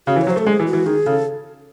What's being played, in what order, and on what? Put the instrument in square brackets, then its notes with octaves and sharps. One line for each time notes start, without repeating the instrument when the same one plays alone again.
[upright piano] C#3 [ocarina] F#4
[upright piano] E3
[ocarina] C#5
[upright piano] F#3
[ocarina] C5
[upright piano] A3 [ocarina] A4
[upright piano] G#3 [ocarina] G#4
[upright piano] E3
[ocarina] F#4
[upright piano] E3
[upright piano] D#3 [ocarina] G#4
[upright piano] C#3 [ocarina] A4